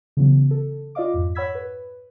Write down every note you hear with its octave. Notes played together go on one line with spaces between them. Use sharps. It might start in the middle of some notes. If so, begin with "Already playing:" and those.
C#3 E3 F#3 B3
A4
F4 D5 D#5 F5 D6
F2 G#2
C#5 F#5 B5 E6 G#6 B6
B4